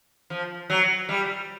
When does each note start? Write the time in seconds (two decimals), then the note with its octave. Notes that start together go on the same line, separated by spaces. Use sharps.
0.30 F3
0.70 F#3
1.09 G3